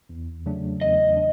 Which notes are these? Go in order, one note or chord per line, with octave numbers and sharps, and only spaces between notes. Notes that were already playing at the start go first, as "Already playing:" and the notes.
E2
C#3 F#3 A3 D4
E2 D#5
D4